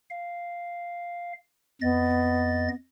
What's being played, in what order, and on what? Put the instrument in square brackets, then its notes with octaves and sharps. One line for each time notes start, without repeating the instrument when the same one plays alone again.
[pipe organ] F5
[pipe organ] F2 D#5 A6 [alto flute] B3